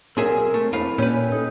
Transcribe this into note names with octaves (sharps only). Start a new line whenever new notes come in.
B1 C4 G#4 A#4 E5
A3
F2 E4 B4 F5
A#2 C#4 G4 B4
D#4 A4